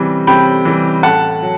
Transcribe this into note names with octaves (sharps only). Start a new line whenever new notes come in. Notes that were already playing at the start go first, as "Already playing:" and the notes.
Already playing: C3 E3 G3
C3 G5 B5
E3 G3
A2 F#5 A5
F#3